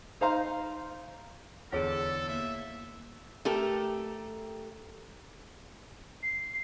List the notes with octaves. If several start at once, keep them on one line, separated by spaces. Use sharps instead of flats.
D#4 C5 F5 A#5 C6
E2 D3 G#4 A4 C#5 F5 D7
A#3 E5
A3 G4 A4 A#4
C7